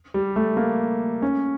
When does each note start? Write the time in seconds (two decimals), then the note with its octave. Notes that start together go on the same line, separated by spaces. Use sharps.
0.14 G3
0.36 A3
0.57 A#3
1.22 C#4